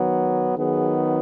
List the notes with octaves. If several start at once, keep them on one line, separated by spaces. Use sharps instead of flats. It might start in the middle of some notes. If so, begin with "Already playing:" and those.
Already playing: D#3 F#3 B3
D#3 F#3 B3 G#4